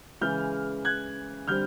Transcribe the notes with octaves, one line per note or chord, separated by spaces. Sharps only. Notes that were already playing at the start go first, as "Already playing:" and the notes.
C#3 E3 G#3 F6 G6
F#6 G#6
D3 G3 C4 F6 G6